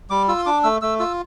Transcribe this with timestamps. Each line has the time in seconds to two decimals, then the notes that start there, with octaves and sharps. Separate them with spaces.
0.10 G3 D6
0.28 F4 E6
0.38 C6
0.46 D4 D6
0.64 A3 E6
0.82 A3 E6
1.00 F4 E6